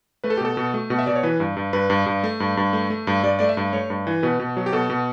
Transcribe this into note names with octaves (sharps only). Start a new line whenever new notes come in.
A3 B4
A4
G4
B2 A4
B2
A3
B2
E5
B2 D5
C#5
E3 B4
G2
G2
G2 B4
G2
G2
A3
G2
G2
A3
A3
G2
G2 D5
A3 D5
E5
G2
A3 C#5
G2
E3
B2 B4
B2
F#3
G4
B2 A4
B2